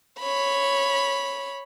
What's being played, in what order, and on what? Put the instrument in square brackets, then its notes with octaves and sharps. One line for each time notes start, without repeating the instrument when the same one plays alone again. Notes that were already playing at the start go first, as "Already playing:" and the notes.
[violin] C#5 B5